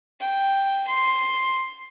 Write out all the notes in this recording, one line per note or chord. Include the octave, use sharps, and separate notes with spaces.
G5
C6